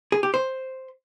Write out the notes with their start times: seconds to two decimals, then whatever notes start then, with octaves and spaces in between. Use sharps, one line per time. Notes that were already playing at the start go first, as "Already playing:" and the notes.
0.12 G#4
0.23 G4
0.34 C5